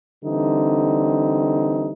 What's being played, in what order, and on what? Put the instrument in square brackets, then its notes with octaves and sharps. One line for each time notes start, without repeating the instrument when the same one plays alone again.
[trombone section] D3 E3 G3 C4 D#4